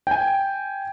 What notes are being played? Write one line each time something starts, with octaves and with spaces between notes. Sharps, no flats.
G5 G#5